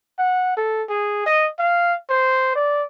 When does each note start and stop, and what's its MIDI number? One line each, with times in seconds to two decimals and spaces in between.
0.19 0.55 78
0.57 0.84 69
0.89 1.25 68
1.26 1.47 75
1.59 1.95 77
2.10 2.55 72
2.55 2.84 74